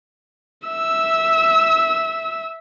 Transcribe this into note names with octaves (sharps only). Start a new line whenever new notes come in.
E5 E6